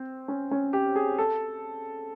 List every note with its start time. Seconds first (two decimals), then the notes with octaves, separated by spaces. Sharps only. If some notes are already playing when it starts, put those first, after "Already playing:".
Already playing: C4
0.28 C#4
0.51 C#4
0.73 G4
0.96 G#4
1.18 A4